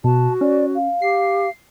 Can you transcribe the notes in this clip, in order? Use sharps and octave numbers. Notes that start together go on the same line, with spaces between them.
B2 F#4 A5
C#4 D5
F5
G4 C7